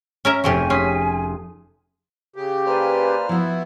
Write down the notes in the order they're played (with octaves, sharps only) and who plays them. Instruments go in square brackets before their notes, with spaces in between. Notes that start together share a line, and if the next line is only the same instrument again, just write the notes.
[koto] C#4 A#4 E5
[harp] F1 G#4 C#6 [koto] F3 C4 G4 [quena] G#5
[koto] C#4 [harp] C6 D#6 B6
[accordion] C#3 G4
[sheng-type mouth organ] A#3 C5 F6 [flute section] B4 D5 G#5
[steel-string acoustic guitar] F3 F#4 [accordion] B3 E4